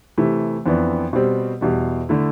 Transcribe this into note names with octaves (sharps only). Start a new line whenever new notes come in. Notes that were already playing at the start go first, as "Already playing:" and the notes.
C3 E3 A3 E4
F2 E3 B3 D4
B2 G3 C4
E2 B2 G3
D3 A3 E4